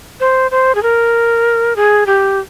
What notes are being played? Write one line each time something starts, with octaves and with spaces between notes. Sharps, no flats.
C5
C5
G#4
A#4
G#4
G4